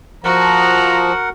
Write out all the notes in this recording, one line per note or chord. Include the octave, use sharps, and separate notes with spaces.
F3 F#4 A#4 F#5 A#5